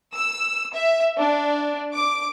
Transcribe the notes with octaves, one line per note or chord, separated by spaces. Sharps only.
E6
E5
D4
D6